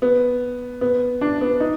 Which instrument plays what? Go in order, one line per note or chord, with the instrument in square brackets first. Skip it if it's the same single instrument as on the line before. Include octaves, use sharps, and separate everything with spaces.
[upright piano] B3
B3
D4
B3
D#4